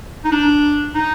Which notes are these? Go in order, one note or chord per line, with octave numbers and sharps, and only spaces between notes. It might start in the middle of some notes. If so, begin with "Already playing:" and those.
D#4
D4
D#4